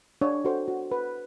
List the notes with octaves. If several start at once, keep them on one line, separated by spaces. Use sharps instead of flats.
D4 C#5
F#4 A4 C5
F#4
B4